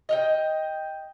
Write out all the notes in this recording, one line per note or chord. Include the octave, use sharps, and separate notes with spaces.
D#5 F5 G5